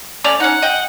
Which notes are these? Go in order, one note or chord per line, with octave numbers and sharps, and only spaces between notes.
A3 C#4 D5 F7
C#4 D#4 F#5
D#5 G5